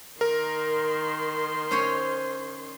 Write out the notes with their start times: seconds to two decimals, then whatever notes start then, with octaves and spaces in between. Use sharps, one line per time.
0.21 D#3 A#4 C6
1.71 C#4 C5 C#5